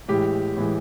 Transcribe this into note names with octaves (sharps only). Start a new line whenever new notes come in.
A2 E3 G#3 G4
A2 E3 G#3